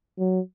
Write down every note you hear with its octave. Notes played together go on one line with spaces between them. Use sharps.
F#3